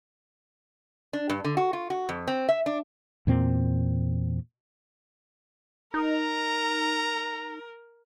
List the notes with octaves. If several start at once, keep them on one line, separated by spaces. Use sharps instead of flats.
D4
G2
D3
F#4
F4
F#4
F2
C4
E5
D4
E2 A#2 C4
D#4 A#4 A#5